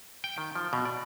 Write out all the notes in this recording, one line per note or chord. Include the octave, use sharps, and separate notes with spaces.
G5
D#3
F3
B2
D5